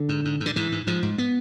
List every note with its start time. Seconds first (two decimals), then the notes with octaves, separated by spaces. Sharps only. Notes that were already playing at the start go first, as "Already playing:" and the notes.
Already playing: D3
0.09 G#2
0.25 G#2
0.40 G#2
0.46 D3
0.56 G#2 E3
0.72 G#2
0.87 G#2 F3
1.03 G#2
1.18 B3